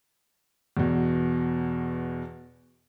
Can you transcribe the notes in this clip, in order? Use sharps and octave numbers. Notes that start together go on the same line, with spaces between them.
E2 B2